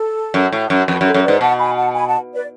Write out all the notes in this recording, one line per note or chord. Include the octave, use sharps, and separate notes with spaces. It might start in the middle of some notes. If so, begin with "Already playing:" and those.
Already playing: A4
F#2
A2
F#2
F2 B4
F#2
A4 C#5
F#2
B4 D5
G#2
B2 F#5 A5
G#5 B5
F#5 A5
G#5 B5
F#5 A5
B4 D5